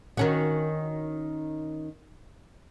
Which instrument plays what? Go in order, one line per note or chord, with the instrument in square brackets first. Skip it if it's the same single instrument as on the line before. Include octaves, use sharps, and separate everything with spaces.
[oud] D#3 C#4 F#4